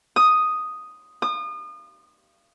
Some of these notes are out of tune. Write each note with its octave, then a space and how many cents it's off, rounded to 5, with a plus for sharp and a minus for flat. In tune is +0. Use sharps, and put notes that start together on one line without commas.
D#6 +0
D#6 -35